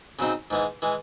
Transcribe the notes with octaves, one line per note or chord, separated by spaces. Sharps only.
C#3 F#3 C4 D#4
G#2 E3 G#3
E3 G#3